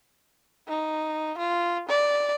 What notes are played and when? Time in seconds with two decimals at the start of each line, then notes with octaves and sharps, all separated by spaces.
0.68 D#4
1.38 F4
1.89 D5